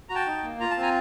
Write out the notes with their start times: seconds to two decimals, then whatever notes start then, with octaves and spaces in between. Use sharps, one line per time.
0.09 F#4 A#5
0.15 G5 A5
0.27 D#4
0.43 A#3
0.60 F4 A#5
0.71 A5
0.77 C4 G#5 A#5